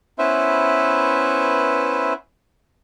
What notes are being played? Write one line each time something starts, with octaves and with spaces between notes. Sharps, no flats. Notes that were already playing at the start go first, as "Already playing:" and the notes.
B3 C#4 E4 B4 C5 E5